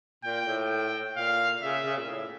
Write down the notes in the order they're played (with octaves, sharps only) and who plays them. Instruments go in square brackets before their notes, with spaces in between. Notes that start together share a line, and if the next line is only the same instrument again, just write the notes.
[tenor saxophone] A#2 [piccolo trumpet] G5
[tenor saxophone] A2
[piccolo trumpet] G5
[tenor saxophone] A#2 [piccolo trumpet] F5
[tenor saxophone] C#3 [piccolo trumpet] E5
[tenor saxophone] C#3
A#2
A2